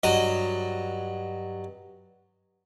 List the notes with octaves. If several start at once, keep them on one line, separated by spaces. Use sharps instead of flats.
G2 F#3 D#5